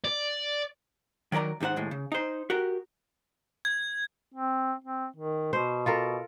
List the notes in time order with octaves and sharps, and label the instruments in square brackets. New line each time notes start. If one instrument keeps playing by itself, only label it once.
[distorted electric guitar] D5
[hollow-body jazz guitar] D#3 F#3 A#4 D5 A#5
D#2 G#2 D#4 C5 F#5
D#2 A2 G#3
C#3
D#4 C5
F#4 G4 A#4
[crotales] G#6
[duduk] C4
C4
D#3
[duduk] B2 [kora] C5
[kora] F4 A4 A#4